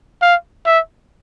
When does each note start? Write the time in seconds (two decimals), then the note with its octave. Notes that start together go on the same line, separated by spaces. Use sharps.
0.22 F5
0.66 E5